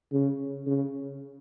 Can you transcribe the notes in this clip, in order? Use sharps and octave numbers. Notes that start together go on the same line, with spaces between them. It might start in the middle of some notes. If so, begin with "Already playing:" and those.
C#3
C#3